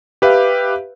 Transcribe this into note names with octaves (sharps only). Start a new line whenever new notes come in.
G4 B4 E5 F5